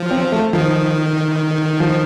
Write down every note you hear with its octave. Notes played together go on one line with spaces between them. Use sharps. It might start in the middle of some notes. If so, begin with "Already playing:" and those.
Already playing: F3
C4
A3
D#3 F3
F3